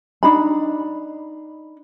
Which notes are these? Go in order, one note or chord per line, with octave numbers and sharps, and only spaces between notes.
D4 D#4 B5